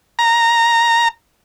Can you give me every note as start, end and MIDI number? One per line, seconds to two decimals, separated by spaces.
0.19 1.08 82